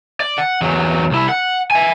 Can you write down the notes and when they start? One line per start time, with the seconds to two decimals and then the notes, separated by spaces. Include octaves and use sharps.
0.20 D5
0.38 F#5
0.62 E2 F#3
1.11 C2 E4
1.29 F#5
1.71 E5 G#5